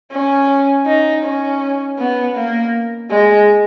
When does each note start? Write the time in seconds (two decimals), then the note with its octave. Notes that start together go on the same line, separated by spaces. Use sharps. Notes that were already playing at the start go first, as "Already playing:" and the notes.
0.12 C#4
0.86 D#4
1.24 C#4
1.98 B3
2.36 A#3
3.10 G#3